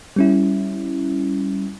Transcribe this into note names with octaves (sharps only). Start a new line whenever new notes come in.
G3 C#4 E4